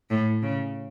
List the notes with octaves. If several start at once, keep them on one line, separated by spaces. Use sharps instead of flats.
A2
C#3